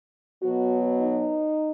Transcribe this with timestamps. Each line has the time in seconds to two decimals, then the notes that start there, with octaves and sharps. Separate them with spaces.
0.40 B2 F#3 B3 F#4
0.97 D#4